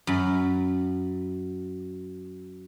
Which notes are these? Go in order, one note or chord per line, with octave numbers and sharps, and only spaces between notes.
F#2 B5